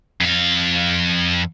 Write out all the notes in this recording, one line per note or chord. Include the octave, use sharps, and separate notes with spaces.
F2 F5